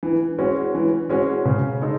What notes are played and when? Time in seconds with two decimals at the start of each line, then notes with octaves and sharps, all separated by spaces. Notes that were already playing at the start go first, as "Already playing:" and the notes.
0.03 E3
0.38 G#3 C#4 F#4
0.75 E3
1.09 G#3 C#4 F#4
1.45 C#3
1.81 G#3 D#4 A4